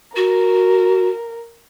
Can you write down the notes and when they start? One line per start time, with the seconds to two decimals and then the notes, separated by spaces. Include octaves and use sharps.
0.16 F#4 A#4